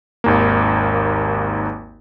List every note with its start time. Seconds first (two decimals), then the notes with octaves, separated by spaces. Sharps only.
0.24 G#1 D#2 A#3